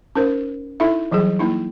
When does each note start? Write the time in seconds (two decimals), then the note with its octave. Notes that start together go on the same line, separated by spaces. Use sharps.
0.15 C#4 D#4 A#4 C5
0.80 D#4 E4 A4 E5
1.11 E3 F#3 G3 G#4
1.39 A#3 D#4 E4